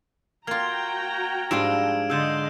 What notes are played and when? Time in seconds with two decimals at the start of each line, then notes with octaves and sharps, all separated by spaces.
0.47 A#3 F4 F#4 G5 A#5 F6 G#6
1.51 G#2 F3 G3 D4 E6 D7 E7
2.10 D3 G#4 D#5 C6 E6 G6 E7